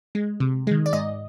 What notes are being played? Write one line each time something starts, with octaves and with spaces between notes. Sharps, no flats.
G#3
C3
D#3 G#3
D5
G#2 D#5